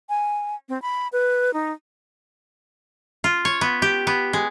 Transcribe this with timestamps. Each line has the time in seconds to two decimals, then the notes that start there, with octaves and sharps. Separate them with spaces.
0.09 G#5
0.69 C4
0.82 B5
1.12 B4
1.53 D#4
3.24 F4
3.45 C#5
3.61 B3
3.82 G4
4.07 B3
4.33 G#3